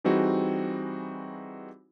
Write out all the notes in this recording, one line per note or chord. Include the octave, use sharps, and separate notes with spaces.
E3 G3 C4 D#4 F#4 G#4